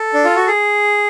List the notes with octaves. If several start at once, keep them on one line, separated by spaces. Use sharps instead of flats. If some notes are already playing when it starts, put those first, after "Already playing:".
Already playing: A4
D4
F4
F#4
G#4